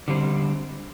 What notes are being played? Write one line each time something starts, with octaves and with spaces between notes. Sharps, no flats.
D3 G3 C4